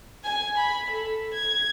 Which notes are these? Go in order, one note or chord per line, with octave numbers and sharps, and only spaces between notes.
G#5
B5
A4
G#6